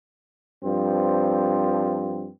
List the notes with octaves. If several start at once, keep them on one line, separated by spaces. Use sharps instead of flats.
G2 F3 C4